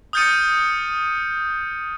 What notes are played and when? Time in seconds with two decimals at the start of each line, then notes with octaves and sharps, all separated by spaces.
0.13 D#6 F6 G6 A6 C#7 D#7